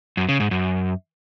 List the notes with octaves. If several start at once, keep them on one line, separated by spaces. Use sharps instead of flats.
F#2
C#3
G#2
F#2